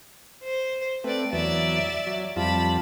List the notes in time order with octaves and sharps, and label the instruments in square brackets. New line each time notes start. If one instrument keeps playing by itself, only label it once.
[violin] C5
[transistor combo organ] A3 C4 [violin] B4 D5
[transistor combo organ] E2 F#3 [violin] D5 E5
[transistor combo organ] F#3
[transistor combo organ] F2 G3 F4 [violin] A5 B5